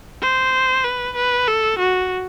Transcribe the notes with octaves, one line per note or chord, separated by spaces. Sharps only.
C5
B4
B4
A4
F#4